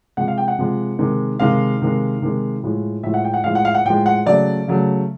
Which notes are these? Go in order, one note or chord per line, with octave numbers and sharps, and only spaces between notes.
C3 F3 G#3 F#5
F5
G5
F#5
C3 F3 G#3
C3 D#3 G#3
C3 D#3 G#3 F5
C3 D#3 G#3
C3 D#3 G#3
A2 F3 G#3
A2 F3 G#3 E5
F#5
G5
F#5
A2 F3 G#3 F5
F#5
F5
F#5
A2 F3 G#3 G5
F#5
C#3 F#3 A3 D5
C#3 F#3 A3